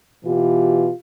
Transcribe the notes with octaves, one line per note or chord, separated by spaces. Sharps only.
B2 E3 F4 G4